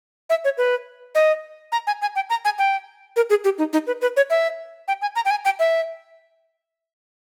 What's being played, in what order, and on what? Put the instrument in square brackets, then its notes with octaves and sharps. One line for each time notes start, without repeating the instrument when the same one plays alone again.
[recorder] E5
C#5
B4
D#5
A#5
G#5
G#5
G5
A#5
G#5
G5
A#4
G#4
G4
D#4
D#4
B4
B4
C#5
E5
G5
G#5
A#5
G5
G#5
G5
E5